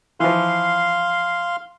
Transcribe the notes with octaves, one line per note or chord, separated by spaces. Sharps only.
E3 F3 F5 C6